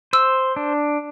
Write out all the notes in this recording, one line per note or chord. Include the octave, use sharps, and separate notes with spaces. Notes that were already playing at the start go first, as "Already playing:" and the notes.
C5 E6
D4